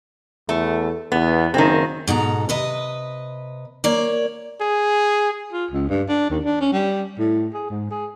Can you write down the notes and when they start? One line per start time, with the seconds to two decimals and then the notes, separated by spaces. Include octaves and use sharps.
0.49 E2 A3
1.12 E2 B3
1.54 F#1 D#3 C4
2.07 G#2 B2 A4 A#5
2.49 C3 B4 D#5
3.84 A#3 C#5 D5
4.61 G#4
5.53 F4
5.71 C#2
5.89 G2
6.09 D4
6.30 D#2
6.45 D4
6.61 C#4
6.73 G3
7.19 A2
7.54 G#4
7.70 G#2
7.91 G#4